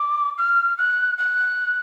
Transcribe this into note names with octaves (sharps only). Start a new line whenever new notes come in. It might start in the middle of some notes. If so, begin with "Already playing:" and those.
Already playing: D6
F6
F#6
F#6